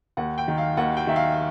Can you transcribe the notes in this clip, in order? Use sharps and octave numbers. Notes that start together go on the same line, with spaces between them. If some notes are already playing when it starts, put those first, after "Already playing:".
D#2 F#5
G5
D#3
F5
D#2 F#5
G5
D#3 E5
F5